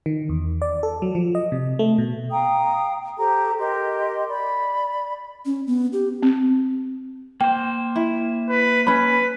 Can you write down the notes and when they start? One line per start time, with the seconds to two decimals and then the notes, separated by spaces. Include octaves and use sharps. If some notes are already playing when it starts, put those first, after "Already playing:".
0.06 D#3
0.29 E2
0.62 D5
0.83 A4
1.02 F#3
1.15 F3
1.35 D#5
1.52 C3
1.79 A3
1.98 B2
2.31 F5 G5 A#5 D#6
3.18 G4 A4 C5 A#5
3.59 G4 A#4 D#5 C6
4.28 D5 B5
5.46 C#4
5.67 B3
5.93 G4
6.23 C4
7.41 A#3 C5 G5
7.96 E4
8.49 B4
8.87 C#4 B4 B5